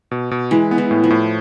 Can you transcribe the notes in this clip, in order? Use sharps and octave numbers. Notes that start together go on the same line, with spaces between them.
B2
B2
E3 G#3
B3
E3
A2
F3
A2